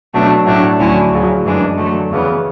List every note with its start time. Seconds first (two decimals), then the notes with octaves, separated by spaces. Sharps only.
0.14 B2 F#3 A3 D4
0.46 A2 F#3 A3 D4
0.79 D2 D3 F#3 C#4 E4
1.12 D2 C#3 F#3
1.45 F#2 E3 G#3 D4
1.77 D3 F#3 A3
2.11 E2 C#3 E3 B3